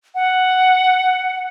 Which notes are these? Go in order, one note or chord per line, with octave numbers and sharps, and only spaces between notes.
F#5